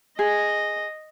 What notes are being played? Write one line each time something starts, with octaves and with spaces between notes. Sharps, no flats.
G#4 D#5